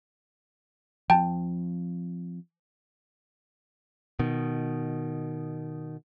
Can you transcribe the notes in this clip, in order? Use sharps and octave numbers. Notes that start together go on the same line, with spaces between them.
F3 C4 G5 A5
B2 D#3